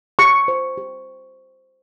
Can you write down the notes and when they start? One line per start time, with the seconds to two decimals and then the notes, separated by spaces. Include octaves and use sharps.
0.19 G4 C#6
0.48 C5
0.77 G4